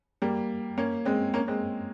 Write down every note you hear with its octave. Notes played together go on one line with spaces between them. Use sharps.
G3 A#3
A#3 C#4
G#3 C4
A#3 C#4
G#3 C4